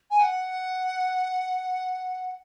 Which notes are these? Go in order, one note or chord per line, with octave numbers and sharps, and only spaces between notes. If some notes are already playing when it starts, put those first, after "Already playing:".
G#5
F#5